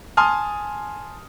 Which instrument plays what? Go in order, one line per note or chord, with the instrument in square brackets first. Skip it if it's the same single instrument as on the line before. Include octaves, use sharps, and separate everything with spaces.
[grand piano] G#5 A5 C6 D#6 F6